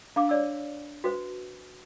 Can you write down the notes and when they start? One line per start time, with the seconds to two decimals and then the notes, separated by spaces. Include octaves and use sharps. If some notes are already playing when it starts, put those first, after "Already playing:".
0.16 D4 F5 D6
0.29 C#5 D5 E6
1.04 F#4 B4 C5